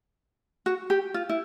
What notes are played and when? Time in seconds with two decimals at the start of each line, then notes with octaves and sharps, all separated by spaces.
0.66 F#4
0.90 G4
1.14 F4
1.29 E4